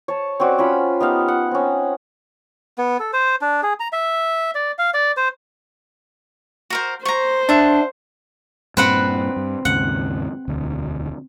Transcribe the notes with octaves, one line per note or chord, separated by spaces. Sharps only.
C#5 A5
C4 C#4 F#4 D5
C#4 F4 B5
B3 D#4 G4 F5
F#5
C4 C#4
B3
A4
C5
D4
G#4
A#5
E5
D5
F5
D5
C5
F#4 A#4 C5
C5 A#5 C#6
D4 E5 F#5
G2 A#2 C4 B4 F#5
G2
D#2 G#2 C#3 F#5
E1 D2